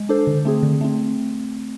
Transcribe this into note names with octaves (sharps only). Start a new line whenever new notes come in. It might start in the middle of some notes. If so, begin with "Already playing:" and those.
Already playing: G#3
D4 A4 C5
D3
A3 C4 G#4
D3
A3 C4